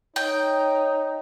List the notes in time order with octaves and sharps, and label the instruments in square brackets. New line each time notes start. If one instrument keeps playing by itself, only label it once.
[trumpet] D#4 [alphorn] C#5 [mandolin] G5